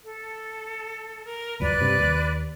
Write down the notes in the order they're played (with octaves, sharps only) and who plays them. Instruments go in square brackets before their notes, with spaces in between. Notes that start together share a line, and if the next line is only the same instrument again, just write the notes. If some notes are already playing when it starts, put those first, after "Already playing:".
[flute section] A4
A#4
[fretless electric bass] D#1 C#2 F#2 [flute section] B4 D5 F#6
[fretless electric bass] G2 C3
D#2